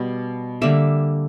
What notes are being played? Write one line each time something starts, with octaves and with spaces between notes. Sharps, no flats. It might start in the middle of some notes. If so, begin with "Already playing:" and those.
Already playing: B2 G3 B3
D3 G3 A#3 E5